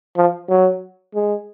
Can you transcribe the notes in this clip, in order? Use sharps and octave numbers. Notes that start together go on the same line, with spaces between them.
F3
F#3
G#3